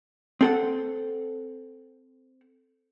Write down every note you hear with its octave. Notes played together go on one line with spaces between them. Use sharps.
C4 A4 F#5